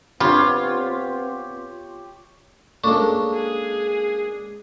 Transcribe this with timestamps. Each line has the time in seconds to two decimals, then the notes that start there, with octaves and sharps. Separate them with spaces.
0.20 B3 C4 D4 F4 G4 C#5 B5 C6
2.84 G#3 A#3 C#4 D4 A4 C#6
3.34 G#4